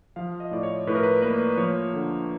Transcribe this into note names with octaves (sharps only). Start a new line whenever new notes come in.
F3 F5
D#5
A2 D5
C#5
A2 B4
A#4
B4
A#3 B4
F3 C#5
D3